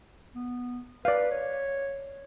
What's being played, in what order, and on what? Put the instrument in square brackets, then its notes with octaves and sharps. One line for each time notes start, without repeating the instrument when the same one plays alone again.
[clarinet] B3
[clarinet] B4 [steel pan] D5 F5
[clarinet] C#5